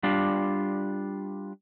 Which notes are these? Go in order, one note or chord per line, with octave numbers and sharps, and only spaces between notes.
G3 D4 F4